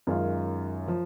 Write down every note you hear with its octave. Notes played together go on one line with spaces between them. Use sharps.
F#2 D#3 G#3 C#4 F4
F3